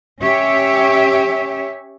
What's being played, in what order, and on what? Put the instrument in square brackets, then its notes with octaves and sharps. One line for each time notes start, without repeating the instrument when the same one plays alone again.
[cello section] C#4 G4 C#5 E5